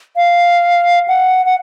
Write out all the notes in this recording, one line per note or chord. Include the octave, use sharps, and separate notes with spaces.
F5
F#5
F#5